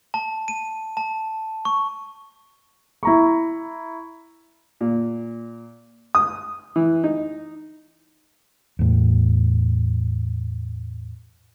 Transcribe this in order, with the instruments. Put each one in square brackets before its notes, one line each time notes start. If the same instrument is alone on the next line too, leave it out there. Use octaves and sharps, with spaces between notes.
[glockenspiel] A5
D#7
A5
C#6
[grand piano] E4 A#5 C#6
[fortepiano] A#2
D#6
E3
D#4
[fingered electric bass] E2 A2